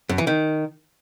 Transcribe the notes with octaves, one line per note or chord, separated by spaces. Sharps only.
F#2
E3
D#3